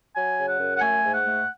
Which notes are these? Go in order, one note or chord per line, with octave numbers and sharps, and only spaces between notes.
F#3 G#5
C#3
F#5
F#2
F#5
A3 G#5
G#2
F#5
A3